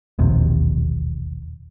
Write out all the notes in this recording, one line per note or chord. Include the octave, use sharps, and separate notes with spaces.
E1 A#1 D#2 C3